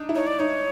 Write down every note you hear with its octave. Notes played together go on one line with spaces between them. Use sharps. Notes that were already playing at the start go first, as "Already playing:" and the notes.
Already playing: D4 D#4
E4
D#4 C#5
D5
D#4 C#5